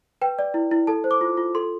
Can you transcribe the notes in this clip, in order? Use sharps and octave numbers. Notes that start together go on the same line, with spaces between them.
B4 G5
D5
E4
E4
A4 A5
C5
D6
F4
F4
A4 C6